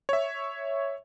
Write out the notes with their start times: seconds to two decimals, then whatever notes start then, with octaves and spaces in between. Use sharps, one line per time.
0.09 C#5 E5